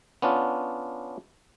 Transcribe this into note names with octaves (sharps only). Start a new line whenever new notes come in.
B3 C#4 D4 F4